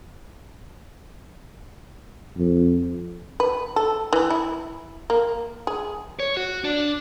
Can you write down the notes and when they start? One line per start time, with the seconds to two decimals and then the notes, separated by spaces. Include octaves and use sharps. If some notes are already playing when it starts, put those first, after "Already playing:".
2.37 F2
3.40 B4
3.76 A4
4.13 E3
4.30 E4
5.10 A#3
5.67 G#4
6.20 C#5
6.37 F#4
6.64 D4